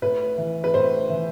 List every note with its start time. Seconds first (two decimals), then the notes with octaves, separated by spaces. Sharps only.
0.02 A2 B4
0.38 E3
0.64 B4
0.74 A2 C5
1.10 E3